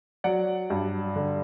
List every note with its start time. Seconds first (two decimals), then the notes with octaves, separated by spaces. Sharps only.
0.24 F#3 D5 F#5
0.70 G2
1.16 D3